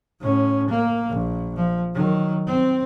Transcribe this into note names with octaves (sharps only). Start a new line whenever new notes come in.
A2 C#4
A#3
A#1
F3
D#3 F#3
C4